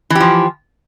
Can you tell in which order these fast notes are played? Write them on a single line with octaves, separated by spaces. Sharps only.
E3 G4 F3